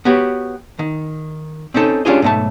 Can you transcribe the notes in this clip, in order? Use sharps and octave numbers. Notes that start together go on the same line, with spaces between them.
B3 F#4 G4 C#5
D#3
C4 C#4 D#4 A4
C#4 D4 F4 G4 G#4 D#5
B1 G#2 C#3 A3 A5